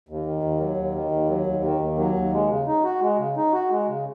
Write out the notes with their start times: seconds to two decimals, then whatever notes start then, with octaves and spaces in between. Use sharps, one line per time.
0.09 D#2
0.26 D#3
0.43 D#2
0.60 F#3
0.77 D#2
0.95 D#3
1.11 D#2
1.29 F#3
1.46 D#2
1.64 D#3
1.81 D#2
1.99 F#3
2.16 D#2
2.33 G#3
2.50 C#3
2.67 D#4
2.84 F#4
3.01 G#3
3.18 C#3
3.37 D#4
3.53 F#4
3.71 G#3
3.88 C#3